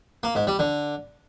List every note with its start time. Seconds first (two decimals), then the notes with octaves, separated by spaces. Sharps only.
0.23 A#3
0.35 G#2
0.47 G3
0.59 D3